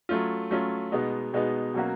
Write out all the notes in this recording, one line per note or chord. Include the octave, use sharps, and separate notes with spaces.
F#3 A3 C#4 F4
F#3 A3 C#4 F4
B2 G#3 B3 D#4
B2 G#3 B3 D#4
B2 F#3 A#3 C#4 F#4